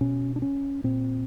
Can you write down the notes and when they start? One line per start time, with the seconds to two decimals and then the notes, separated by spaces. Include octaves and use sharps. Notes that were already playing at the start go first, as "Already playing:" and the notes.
0.01 B2 C#4
0.36 D4
0.42 C#4
0.84 A#2 C4